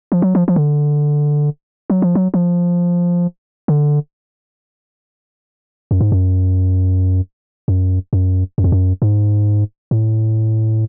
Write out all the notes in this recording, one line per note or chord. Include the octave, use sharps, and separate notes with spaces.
F3
F#3
F3
F3
D3
F#3
F3
F#3
F3
D3
F#2
G#2
F#2
F#2
F#2
F#2
F2
F#2
G#2
A2